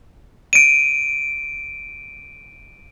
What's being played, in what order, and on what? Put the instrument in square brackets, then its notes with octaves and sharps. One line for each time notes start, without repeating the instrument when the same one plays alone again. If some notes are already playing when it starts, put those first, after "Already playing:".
[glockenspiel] D7 D#7